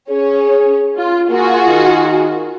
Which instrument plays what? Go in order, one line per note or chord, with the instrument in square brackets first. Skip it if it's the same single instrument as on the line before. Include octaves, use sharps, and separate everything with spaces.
[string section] C#4 C#5 [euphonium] G#4
[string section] F4
[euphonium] A#3 [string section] F4 F#4 G#4
[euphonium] D#3